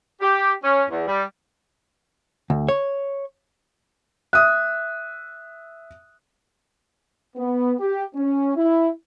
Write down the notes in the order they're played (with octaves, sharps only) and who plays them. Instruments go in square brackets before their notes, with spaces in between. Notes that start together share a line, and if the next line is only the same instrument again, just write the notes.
[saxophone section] G4
C#4
E2
G3
[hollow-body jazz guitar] D2
C#5
[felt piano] E5 D#6 [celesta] F#6
[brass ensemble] B3
G4
C#4
E4